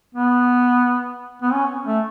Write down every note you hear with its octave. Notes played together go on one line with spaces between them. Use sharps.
B3
B3
C#4
A3